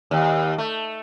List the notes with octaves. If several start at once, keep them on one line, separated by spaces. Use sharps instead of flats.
D#2
A3